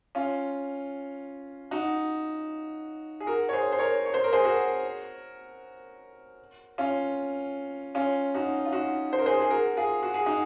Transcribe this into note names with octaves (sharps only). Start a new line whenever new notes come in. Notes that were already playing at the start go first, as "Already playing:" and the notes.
C#4 F4
D#4 F#4
G#4
F#4 A#4
C#5
G#4 C5
C5
A#4 C#5
C#5
C5
A#4
G#4 C5
F#4 A#4
C#4 F4
C#4 F4
D#4 F#4
F4
D#4 F#4
C5
A#4
G#4 C5
G#4
F#4 A#4
F4 G#4
F#4
G#4
D#4 F#4